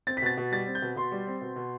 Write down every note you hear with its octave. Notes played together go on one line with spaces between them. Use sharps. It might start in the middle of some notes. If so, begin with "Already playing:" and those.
C4 A6
B6
B2 A6
B2
G3 A6
C4
G6
B2
B2 C6
G3
C4
B2
B2